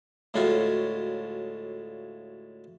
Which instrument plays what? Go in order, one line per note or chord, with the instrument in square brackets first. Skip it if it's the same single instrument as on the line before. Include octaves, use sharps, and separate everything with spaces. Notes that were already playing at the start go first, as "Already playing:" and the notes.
[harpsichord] D2 A2 G#3 C#4 F4 F#4